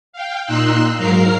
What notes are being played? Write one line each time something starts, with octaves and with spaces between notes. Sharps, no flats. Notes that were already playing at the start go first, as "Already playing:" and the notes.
F5 G5
A#2 D#4 C6 E6 F#6
G#2 F#3 A#4 F5 A#5 C7